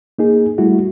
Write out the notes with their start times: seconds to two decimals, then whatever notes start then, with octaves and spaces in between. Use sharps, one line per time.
0.18 A#3 D#4 G#4
0.58 G3 A3 E4 F#4